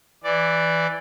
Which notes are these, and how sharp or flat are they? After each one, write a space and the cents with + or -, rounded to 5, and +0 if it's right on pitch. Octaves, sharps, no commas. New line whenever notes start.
E3 +0 D5 +0